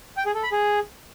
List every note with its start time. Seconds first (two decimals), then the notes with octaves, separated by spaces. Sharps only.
0.17 G5
0.26 G#4
0.34 A4
0.43 B5
0.52 G#4